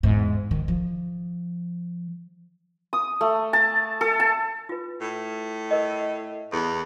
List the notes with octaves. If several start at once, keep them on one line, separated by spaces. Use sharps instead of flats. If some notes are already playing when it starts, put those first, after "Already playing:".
E2 G#2
D#3
F3
D#6
A3
A5
A4
A5
F4 B4
A2
A#4 D#5
E2 A4